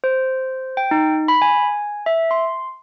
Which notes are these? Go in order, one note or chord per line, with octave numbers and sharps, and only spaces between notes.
C5
G5
D#4
B5
G#5
E5
C6